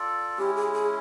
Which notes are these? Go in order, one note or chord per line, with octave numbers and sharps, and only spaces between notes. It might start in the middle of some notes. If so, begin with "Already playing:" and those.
Already playing: F4 A4 D5
G#3 C#4 E4 G4
G#4
G#4